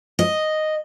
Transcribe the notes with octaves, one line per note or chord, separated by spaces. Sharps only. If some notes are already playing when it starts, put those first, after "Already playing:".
D#5